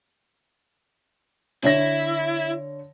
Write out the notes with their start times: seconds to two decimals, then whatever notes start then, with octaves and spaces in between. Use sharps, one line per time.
1.64 D3 E4 C#5 A#6